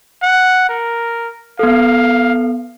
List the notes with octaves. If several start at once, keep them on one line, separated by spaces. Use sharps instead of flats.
F#5
A#4
B3 A4 F5